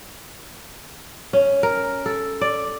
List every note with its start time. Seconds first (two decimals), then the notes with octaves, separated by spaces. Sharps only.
1.33 C#4
1.63 A#4
2.06 A4
2.41 D5